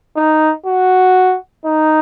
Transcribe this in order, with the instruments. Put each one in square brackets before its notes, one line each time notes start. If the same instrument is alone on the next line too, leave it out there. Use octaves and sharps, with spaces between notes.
[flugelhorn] D#4
F#4
D#4